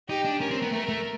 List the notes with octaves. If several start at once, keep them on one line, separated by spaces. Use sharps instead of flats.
D#4 G4
D4
C#4 A#4
C4
B3
A3 A#4
A3